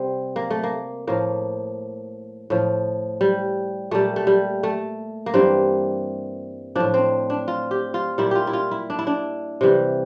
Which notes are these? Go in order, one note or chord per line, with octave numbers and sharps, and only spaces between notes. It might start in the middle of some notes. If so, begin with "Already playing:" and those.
Already playing: C3 G3 C4
A#3
A3
A#3
A2 F3 A#3
A2 F3
G3
A#2 G3 A3
A3
G3
A3
A#3
G2 E3 G3 C4
A2 F3 D4
C4
D4
F4
G4
F4
A#2 G3 E4
F4 G4
E4
F4
E4
D4
E4
D4
C3 E3 G3